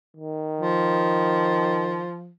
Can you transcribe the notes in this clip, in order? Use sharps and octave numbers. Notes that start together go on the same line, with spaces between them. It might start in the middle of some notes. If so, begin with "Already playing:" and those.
D#3
F3